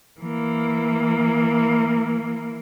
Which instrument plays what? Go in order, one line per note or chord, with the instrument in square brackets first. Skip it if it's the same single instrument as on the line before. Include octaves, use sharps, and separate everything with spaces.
[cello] E3 A#3